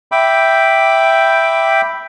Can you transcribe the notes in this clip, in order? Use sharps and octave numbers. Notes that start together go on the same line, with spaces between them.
E5 G5 B5 D6